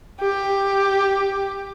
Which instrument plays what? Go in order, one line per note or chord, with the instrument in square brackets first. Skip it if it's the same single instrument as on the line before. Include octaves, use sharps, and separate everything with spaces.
[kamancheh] G4